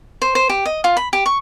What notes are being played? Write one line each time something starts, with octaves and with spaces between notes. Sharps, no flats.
C5
C5
G4
D#5
F4
B5
G4
C#6